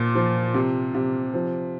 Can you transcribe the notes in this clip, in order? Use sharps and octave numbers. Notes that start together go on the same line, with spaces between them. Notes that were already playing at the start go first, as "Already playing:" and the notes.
Already playing: A#2 F3
F3
C3
C3
F3